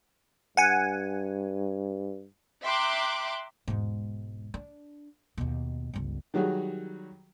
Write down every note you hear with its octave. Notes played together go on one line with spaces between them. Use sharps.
G2 F#5 G#5
E5 G5 A#5 C6 D6 F#6
E1 G#2
D4
D#2 B2
G1 C#2
D#3 F#3 G3 F#4 G#4